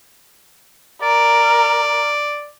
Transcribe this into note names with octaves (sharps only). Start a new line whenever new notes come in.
A#4 D5